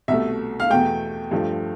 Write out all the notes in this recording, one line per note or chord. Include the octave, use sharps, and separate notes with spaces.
C2 B2 A3 E5
F5
E2 B2 A3 G5
G2 F3 A3